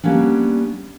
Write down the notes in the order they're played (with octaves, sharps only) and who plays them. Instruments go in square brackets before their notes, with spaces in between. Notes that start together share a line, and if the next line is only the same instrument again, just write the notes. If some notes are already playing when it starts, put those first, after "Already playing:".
[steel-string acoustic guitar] G3 A#3 B3 C#4 D4